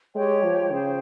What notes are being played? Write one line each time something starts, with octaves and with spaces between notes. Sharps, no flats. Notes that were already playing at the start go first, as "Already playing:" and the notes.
G#3 G4 C#5 G5
F3
C#3 G#4 C5 G5